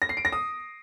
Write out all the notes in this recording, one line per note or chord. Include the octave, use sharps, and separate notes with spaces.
A#6
C7
D7
A#6
D#6